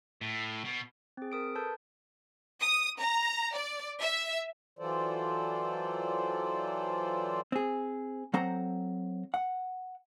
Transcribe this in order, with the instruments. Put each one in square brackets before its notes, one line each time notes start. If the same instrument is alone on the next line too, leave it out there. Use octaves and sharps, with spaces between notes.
[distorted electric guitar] A2
B2
[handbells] C4 G#4
A#4 D#6 D7
A4 B4 A5 G6
[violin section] D#6
A#5
D5
E5
[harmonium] E3 F#3 F4 A4 C5 D5
[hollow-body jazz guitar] C4 G#4
F#3 C4 A4 C5 F#5 A#5
F#5